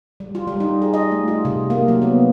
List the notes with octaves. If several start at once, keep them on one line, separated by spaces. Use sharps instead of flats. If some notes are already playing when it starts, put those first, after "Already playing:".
G3
F4
G3
D#4
G#4
D#5
A3
F4
C3
A#3
F#3
B3